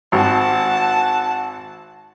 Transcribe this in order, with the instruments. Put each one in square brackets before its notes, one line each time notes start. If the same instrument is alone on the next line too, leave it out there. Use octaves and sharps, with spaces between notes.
[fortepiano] G#1 [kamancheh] F#5 A5